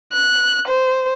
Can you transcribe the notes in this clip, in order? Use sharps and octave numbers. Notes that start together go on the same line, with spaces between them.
F#6
C5